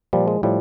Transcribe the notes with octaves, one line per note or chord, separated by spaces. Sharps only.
A#2 F3 G3
G#3
A2 F3 G3